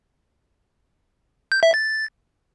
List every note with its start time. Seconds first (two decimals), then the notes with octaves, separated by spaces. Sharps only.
1.52 G6
1.63 E5
1.74 A6